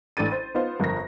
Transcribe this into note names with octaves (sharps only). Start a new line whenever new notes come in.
A1 D4 A4 A6 D#7
C5
B3 D#4 F4 C5
G1 F2 A#4 A#6